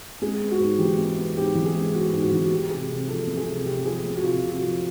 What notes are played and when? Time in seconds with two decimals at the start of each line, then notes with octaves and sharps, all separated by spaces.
0.22 G#3 G#4
0.40 B3
0.51 F#4
0.60 G#2
0.79 E3 G4
0.99 G#3
1.17 B3
1.36 G#2 G4
1.55 E3
1.65 G#4
1.74 G#3
1.94 B3 F#4
2.13 G#2
2.22 F#4
2.32 E3
2.44 F#4
2.51 A3 G4
2.70 C3 G#4
2.89 C3
3.08 F3 A4
3.27 A3
3.37 G#4
3.47 C3
3.66 C3 G4
3.84 F3 G#4
4.04 A3
4.16 F#4
4.23 C3 F4
4.42 C3
4.51 F#4
4.61 F3